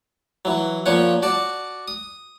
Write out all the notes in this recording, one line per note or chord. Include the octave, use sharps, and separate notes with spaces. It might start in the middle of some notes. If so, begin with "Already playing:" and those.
E3 F#3
A#2 F3 C#4 C#5 F#5
F#4 D5 A5
D#6